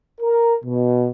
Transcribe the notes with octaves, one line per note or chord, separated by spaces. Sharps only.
A#4
B2